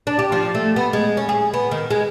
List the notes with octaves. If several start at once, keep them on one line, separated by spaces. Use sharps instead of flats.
D4
G4
F3
A3
B3
G#3
C#4
G#4
B3
D#3
G#3